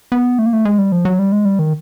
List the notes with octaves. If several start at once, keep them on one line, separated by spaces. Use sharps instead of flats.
B3
A3
A#3
A3
G#3
G3
F3
F#3
G3
G#3
G3
D#3